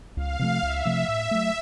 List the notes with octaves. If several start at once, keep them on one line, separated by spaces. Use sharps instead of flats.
C#2 F5
C3 F3 A3
C#2 E5
C3 F3 A3
A2 E5
F#3 A3